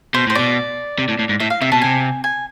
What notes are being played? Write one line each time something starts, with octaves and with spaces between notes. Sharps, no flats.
B2 C5
A2 C5
B2 D5
C3
A2
A2
G#2
A2 E5
F5
C3 E5
B2 A5
C3 G#5
G#5